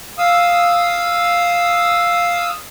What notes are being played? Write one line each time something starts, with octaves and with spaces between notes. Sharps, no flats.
F5 D#6 E6